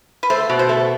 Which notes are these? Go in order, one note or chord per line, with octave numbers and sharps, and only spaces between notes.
B4
A3 C5
B2
C5
A3